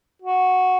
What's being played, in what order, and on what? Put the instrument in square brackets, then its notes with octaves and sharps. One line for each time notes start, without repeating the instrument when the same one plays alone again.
[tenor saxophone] F#4